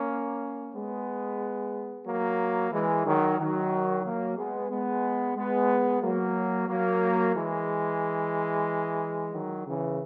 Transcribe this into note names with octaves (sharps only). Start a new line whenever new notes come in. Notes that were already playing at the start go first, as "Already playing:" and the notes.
Already playing: A#3 C#4
G#3 B3
F#3 A#3
E3 G#3
D#3 F#3
D#3 F#3
F#3 A#3
G#3 B3
G#3 B3
G#3 B3
F#3 A#3
F#3 A#3
E3 G#3
D#3 F#3
C#3 E3